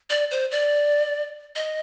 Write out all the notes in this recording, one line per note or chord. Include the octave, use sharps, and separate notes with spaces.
D5
C5
D5
D#5